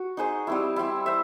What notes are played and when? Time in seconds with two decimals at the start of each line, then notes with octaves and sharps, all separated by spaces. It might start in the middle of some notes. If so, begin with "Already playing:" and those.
Already playing: F#4
0.17 D#4 G#4 C5
0.47 G3 C4 E4
0.76 G3 C4 E4
1.06 C5 E5